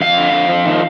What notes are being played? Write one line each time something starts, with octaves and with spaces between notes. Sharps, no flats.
F2 F5
D3
F2
F3
D#3